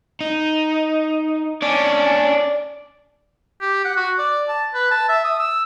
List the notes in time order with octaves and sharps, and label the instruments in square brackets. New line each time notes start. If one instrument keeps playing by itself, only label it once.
[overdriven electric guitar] D#4
[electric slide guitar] C#4 D4 [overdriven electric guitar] D5
[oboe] G4
F#5
F#4
D5
A5
B4
A5
E5
D#6
E6